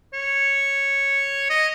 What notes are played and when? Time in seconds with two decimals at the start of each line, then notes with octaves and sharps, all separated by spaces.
0.13 C#5
1.50 D#5